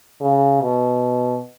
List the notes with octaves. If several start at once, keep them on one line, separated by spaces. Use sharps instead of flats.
C#3
B2